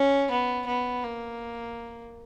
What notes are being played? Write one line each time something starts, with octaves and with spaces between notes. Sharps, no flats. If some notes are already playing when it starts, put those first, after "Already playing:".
Already playing: C#4
B3
B3
A#3